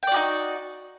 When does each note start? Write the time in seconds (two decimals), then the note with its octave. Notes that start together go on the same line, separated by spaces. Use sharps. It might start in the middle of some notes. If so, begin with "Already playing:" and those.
0.03 G5
0.07 D5
0.12 F#4
0.16 D#4